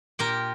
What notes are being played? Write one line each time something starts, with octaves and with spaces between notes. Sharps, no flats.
A#2 G4 A#4